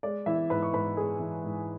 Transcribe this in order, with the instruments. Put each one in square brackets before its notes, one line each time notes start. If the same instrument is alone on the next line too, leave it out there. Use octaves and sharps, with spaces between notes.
[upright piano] G#3 D5
E3 E4 E5
G#2 B4 B5
C#6
G#2 B4 B5
G#3 G#4 G#5
E3
G#2